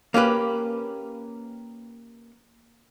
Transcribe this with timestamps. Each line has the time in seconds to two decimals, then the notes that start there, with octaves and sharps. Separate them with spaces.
0.14 A#3 C#4 G4 B4